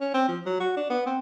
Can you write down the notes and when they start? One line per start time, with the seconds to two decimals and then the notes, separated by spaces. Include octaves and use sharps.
0.01 C#4
0.14 C4
0.28 F3
0.46 F#3
0.60 F#4
0.77 D4
0.90 B3
1.06 C4